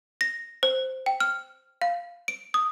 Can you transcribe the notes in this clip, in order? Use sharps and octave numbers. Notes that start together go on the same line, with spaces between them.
A#6
C5
G5
F6
F5
D7
D#6